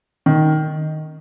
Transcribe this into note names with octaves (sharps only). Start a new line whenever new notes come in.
D#3